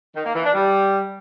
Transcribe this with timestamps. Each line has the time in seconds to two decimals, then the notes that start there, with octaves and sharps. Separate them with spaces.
0.15 D#3
0.25 A#3
0.34 E3
0.44 D4
0.53 G3